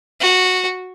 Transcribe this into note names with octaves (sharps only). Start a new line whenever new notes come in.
F#4